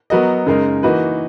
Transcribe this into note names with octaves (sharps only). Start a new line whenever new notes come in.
F#3 B3 F#4 A#4 D#5
F#2 C#3 G#3 D#4 A#4
E3 A#3 D#4 F#4 B4